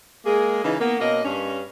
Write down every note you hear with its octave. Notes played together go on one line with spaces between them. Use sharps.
G#3 A#3 G#4
C#3 E3 D#4
A#3 B3
B2 A#3 C#4 D#5
G2 C#4